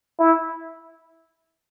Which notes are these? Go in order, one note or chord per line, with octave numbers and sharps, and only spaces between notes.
E4